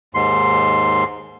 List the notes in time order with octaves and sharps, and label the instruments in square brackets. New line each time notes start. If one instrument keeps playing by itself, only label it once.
[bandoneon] D#2 G#2 C6